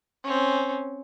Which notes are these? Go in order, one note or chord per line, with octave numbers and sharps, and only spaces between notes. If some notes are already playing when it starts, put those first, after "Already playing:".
C4 C#4